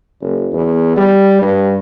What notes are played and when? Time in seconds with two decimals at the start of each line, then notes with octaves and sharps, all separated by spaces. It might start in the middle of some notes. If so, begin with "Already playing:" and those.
0.21 F#1
0.53 E2
0.97 G3
1.42 G2